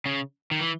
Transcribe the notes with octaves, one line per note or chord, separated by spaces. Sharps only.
C#3
D#3
E3